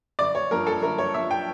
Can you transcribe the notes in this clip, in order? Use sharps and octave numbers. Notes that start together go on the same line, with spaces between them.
G1 D5
C#5
G2 F3 A#4
A4
G1 A#4
C#5
G2 F3 E5
G5